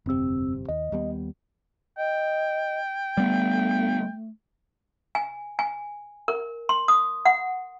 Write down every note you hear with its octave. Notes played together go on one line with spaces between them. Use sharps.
G1 F2 C3 C4 E6
D#2 D#5
D#2 G3 B3
D#5 G5
G3 A3 B3
G#5
G#5
A#4
C6
D#6
F#5